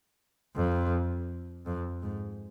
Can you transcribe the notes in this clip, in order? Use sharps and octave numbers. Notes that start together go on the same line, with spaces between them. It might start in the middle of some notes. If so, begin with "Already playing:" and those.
F2
F2
G#2